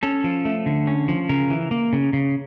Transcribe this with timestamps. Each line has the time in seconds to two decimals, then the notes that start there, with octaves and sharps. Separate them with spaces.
0.03 C#4 A4
0.24 F3
0.45 A3
0.66 D3
0.87 C#4
1.08 F3
1.29 C#3 A#4
1.50 E3
1.71 A#3
1.93 C#3
2.13 C#3